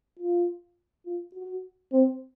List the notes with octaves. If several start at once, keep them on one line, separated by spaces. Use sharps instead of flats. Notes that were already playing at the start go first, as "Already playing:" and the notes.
F4
F4
F#4
C4